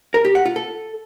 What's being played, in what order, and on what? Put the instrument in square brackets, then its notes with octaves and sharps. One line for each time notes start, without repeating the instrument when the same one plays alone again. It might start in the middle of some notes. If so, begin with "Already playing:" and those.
[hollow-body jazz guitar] A#4
G4
F#5
F4
A4